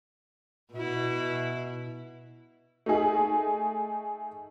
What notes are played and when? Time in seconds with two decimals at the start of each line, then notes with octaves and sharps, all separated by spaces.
0.73 B2 E4
2.86 A3 D#4 G#4